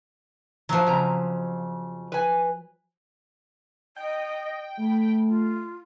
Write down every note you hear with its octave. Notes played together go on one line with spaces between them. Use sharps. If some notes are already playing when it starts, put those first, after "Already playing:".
F3 F#3
F2 C#3 A#5
B4 G#5
D#5 G5
A3 B5
F4